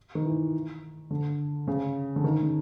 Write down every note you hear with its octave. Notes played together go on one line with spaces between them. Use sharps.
D#3
E3
D3
C#3
D3
D#3
C#3